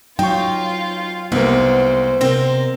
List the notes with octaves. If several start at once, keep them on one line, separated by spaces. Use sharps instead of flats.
F#3 D#4 F4 F5 G5 C#6
C2 A#3 B3 D#4 C5
C3 C4 A#4 D#5